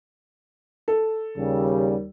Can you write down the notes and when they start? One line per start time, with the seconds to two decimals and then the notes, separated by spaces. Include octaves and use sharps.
0.88 A4
1.37 D#2 C#3 G3